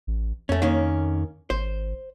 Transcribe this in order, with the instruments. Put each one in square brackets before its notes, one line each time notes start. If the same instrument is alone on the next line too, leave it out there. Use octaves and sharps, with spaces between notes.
[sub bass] A1
[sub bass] F2 [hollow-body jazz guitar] A3 C#4
[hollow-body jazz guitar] D#3 A#3 C#4
[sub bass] G#1 [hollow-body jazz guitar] C5